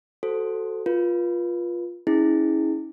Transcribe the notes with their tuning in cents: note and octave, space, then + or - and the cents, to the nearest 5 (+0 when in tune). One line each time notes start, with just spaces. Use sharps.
F#4 +10 A4 +0 C5 -10
F4 +0 B4 -35
C#4 +0 E4 -35 G#4 +0